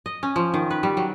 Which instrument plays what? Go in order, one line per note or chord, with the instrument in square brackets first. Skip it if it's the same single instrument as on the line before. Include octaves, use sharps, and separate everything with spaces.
[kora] D#5
C#4
F3
D#3
B4
G3
F#3